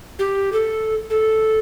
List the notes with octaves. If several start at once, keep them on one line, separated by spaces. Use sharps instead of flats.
G4
A4
A4